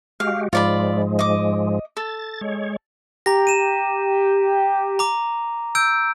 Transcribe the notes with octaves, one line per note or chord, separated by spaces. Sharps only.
G#3 F#4 G4 F5
G#2 F3 G#3 F4 D5 B5
D#5 D6
A4 A6
G#3 C#5
G4 A#5 A#6
D#7 E7
A#5 D6
E6 G6 D7